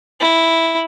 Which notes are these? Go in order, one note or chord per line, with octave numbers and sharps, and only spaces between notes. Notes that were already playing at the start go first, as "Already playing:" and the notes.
E4